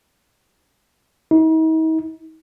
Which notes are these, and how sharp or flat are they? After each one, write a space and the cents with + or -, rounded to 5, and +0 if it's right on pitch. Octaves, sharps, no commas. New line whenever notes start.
D#4 +45